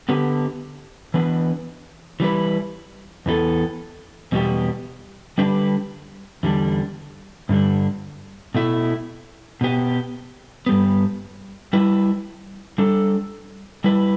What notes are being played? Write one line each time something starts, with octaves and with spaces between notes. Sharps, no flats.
D3 B3 G4 B4
E3 B3 D4 B4
E3 G3 B3 E4 B4
E2 E3 B3 D4 A4
E2 B2 G3 B3 G4
D3 G3 D4 G4 B4
E2 D3 G3 D4
G2 D3 G3 D4
B2 A3 E4
B2 B3 G4
G2 G3 B3
G3 E4 B4
G3 D4 A4
G3 E4 B4